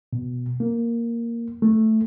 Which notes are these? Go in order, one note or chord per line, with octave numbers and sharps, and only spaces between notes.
B2
A#3
A3